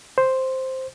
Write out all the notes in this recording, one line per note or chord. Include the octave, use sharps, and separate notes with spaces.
C5